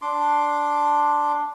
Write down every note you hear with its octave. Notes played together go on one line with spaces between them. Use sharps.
D4 C6 D6